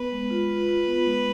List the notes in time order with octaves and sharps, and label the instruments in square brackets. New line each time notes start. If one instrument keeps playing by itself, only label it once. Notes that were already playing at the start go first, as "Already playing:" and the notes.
Already playing: [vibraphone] B3 [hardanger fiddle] B4
[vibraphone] G#3
F4
F4
F4
B3
G#3